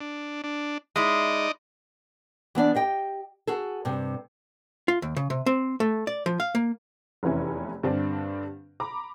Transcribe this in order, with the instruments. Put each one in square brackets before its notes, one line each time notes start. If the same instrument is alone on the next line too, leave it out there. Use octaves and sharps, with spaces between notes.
[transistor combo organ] D4
D4
[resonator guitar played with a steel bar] G#3 E4 [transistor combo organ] D#4 D5 D#5
[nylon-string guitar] E3 B3 D4 D5
G4 D#5 G5
F#4 G#4 A4
G2 C3
[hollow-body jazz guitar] F4
D#2
C#3
C3
C4
A3
D5
F3
F5
A#3
[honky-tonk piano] F1 E2 E3 C#4 E4
G2 D3 C4 D4
A#5 B5 D6